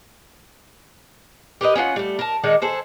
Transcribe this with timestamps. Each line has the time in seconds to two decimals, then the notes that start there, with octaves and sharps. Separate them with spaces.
1.61 G4 A#4 B4 D#5
1.75 C#4 D4 F4 F#5
1.96 G3 A3
2.19 A#4 A5
2.44 D#3 G#3 D4 D#4
2.62 G#4 A4 C5